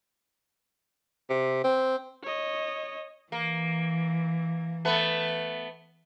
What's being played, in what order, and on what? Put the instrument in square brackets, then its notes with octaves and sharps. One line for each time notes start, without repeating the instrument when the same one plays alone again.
[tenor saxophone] C3
C4
[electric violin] C#5 D#5
[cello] E3 [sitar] A#3
[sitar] A3 B3 B4